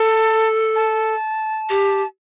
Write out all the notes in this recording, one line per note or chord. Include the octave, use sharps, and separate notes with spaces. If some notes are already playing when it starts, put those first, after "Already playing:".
Already playing: A4 A5
A5
G4